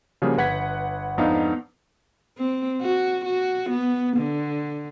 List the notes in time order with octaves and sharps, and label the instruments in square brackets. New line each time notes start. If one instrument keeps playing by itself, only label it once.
[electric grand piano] C#3 F3 G3 A#3 F#4 G#4
G1 B4 F#5 G#6 B6
F2 G#2 B3 D4 D#4 F5
[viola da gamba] C4
F#4
F#4
B3
D3